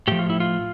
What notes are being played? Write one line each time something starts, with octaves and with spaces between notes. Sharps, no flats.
A2 F3 G4
F4
E4
F4